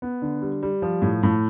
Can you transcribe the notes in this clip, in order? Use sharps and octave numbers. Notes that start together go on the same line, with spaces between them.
B3
D3
G3
G3
F3
A2
A2